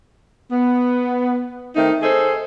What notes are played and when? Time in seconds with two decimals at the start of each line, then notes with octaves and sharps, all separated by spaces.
0.51 B3
1.76 D#3 A3 C4 D#4
2.03 G#4 A4 C5 D#5